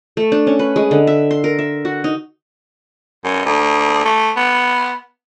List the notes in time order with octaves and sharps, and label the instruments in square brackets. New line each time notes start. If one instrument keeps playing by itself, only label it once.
[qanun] A3
D4
C#4
B4
G#3
D3
E5
C6
A#4
E5
F#4
D#4
[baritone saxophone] F#2
D2
A3
B3